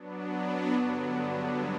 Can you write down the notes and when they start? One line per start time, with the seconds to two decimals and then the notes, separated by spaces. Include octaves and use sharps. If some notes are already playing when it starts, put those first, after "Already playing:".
Already playing: F#3 B3 D4
0.75 G2 D3 F#3 B3 D4